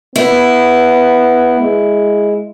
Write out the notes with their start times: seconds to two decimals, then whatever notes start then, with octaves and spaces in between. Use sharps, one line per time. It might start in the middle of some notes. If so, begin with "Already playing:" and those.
0.16 B3 E4
1.60 G#3